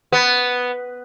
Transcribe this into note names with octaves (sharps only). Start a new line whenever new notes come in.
B3